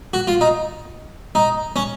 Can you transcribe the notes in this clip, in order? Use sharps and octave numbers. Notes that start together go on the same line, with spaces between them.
F#4
F4
D#4
D#4
C#4